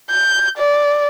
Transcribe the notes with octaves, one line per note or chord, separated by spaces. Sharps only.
G6
D5